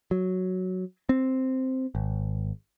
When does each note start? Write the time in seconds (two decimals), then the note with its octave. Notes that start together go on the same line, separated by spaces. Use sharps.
0.11 F#3
1.09 C4
1.95 G#1